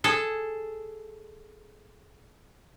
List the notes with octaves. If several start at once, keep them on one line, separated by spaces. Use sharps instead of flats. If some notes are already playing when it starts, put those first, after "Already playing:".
G#4 A4